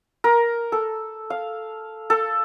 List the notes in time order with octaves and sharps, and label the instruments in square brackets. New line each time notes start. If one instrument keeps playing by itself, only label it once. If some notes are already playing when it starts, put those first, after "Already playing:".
[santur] A#4
A4
F5
A4